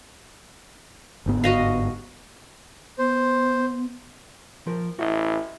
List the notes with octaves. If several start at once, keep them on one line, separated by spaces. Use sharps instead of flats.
G1 G#2 B3
F#4 D#5 F5
B3 C5
F3 A#4
A1 E4 F#4 D#5